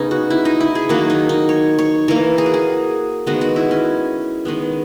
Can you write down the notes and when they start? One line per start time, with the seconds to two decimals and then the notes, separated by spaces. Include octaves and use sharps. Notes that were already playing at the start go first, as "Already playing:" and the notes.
Already playing: C#3 B3 C#4 D#4 G#4
0.11 F#4
0.30 E4
0.45 D#4
0.60 E4
0.75 G#4
0.89 D#3 F#3 A#3 F#4
1.10 D#4
1.29 D#4
1.49 C#5
1.78 C#5
2.08 E3 A#3 A#4
2.38 G#4
2.46 F#4
2.54 G#4
3.27 D#3 G#3 B3 F#4
3.41 F#4
3.56 E4
3.71 C#4
4.45 D#3 G#3 B3